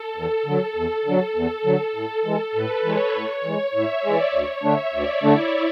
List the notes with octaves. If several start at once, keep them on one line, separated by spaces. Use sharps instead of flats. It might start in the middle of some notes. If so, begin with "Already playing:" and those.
Already playing: A4
E2 A4
D3 F#3
E2
D3 F#3
E2
D3 F#3
A2
E3 G#3
A2 B4
E3 G#3 C#5
A2 C#5
E3 G#3 C#5
A2 E5
E3 G#3 D5
D2 C#5
D3 A3 D4 E5
D2 D5
D3 A3 D4 E4